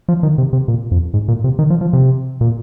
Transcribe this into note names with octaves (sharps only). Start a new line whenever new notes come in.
F3
D#3
C3
C3
A#2
F2
G#2
A#2
C3
D#3
F3
F3
C3
A#2